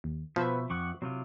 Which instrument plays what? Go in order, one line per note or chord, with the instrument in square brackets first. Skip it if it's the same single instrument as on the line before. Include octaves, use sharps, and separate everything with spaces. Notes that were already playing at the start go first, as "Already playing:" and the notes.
[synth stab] D#2
[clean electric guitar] B2 [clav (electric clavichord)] F3 [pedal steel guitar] B3 B4 [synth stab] C5 E5
[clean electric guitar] F2 [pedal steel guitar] F#5 C#6 D6
[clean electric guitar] C3 F#3 [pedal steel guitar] C4 E4 F4